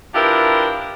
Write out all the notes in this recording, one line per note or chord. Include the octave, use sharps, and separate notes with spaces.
F3 D4 E4 G4 A#4 B4